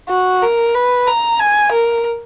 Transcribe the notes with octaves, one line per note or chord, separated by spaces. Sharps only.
F#4
A#4
B4
A#5
G#5
A#4